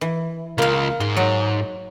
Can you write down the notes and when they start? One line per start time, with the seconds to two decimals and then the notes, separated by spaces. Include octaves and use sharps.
0.01 E3
0.58 C#2 A#3 F5
1.00 G#2 C6
1.17 F#3